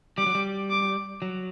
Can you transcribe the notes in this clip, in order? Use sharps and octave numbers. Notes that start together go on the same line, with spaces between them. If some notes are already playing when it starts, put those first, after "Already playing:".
G3 D6
F#3
G3
D6
F#3